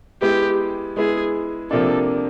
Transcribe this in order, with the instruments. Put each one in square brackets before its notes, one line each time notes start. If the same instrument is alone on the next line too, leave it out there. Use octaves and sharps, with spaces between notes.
[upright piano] G#3 B3 E4 [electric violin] G4
[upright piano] G#3 B3 E4 [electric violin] G#4
[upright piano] C3 F3 A#3 D4 [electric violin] A4